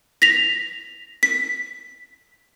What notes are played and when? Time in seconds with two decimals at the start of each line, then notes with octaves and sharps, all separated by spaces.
0.22 A#6 B6 F7
1.23 B6